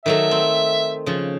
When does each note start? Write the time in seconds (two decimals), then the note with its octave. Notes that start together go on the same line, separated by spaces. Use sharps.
0.06 D#3 F#3 A3 E5
0.31 C4
1.06 C#3 F3